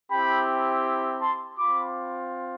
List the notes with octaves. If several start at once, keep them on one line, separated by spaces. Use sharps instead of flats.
C4 E4 G4 G5 B5
A5 C6
C4 F4 B5 D6